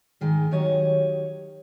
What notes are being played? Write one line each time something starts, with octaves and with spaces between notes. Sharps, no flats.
G#2 D#3 G#3
D#3 F#3 G4 C#5 D#5